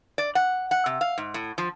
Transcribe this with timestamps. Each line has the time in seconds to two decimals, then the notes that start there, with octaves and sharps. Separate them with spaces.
0.18 D5
0.35 F#5
0.71 F#5
0.86 C3
1.01 F5
1.18 G#2
1.34 A2
1.58 F3